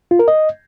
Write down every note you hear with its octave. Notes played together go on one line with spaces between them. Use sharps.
F4
A#4
D#5